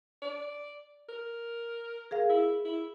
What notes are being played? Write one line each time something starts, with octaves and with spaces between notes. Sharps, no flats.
D5
A#4
G#4 A#4 F5
E4
E4